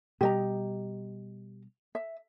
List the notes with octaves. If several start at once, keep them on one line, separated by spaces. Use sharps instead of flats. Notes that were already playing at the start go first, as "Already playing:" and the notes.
B2 G3 G4 D#5 A#5
E5